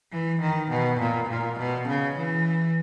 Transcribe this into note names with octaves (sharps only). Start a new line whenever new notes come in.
E3
D#3
B2
A#2
A#2
B2
C#3
E3